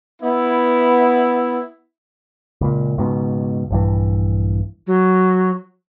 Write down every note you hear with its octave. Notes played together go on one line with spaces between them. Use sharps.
B3 E4
C#2 A#2
C#2 G#2 B2
A#1 G2 E3
F#3